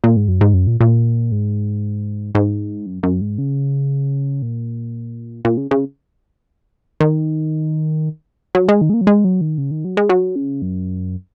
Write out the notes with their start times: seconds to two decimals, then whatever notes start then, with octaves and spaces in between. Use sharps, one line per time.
0.04 A#2
0.16 G#2
0.28 F#2
0.41 G#2
0.54 F#2
0.67 A#2
0.81 A#2
1.32 G#2
2.35 G#2
2.86 F#2
3.03 F#2
3.21 G#2
3.38 C#3
4.42 A#2
5.45 A#2
5.57 C#3
5.71 C#3
7.00 D#3
8.55 F#3
8.68 G#3
8.81 D#3
8.90 G#3
8.94 A#3
9.01 F#3
9.07 G#3
9.24 F#3
9.41 D#3
9.58 C#3
9.71 D#3
9.85 F#3
9.97 G#3
10.09 F#3
10.36 C#3
10.62 F#2